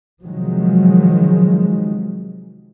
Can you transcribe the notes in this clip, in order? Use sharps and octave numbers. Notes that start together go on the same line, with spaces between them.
C3 D#3 F3 F#3 G#3